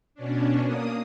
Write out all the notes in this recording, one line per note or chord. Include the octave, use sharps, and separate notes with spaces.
B2 C#4 D4
A#3 D#6